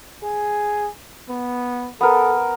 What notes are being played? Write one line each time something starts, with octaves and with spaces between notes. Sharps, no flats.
G#4
B3
B3 A4 A#4